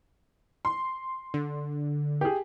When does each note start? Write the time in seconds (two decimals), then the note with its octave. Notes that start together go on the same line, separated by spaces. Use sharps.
0.65 C6
1.34 D3
2.21 G4 G#4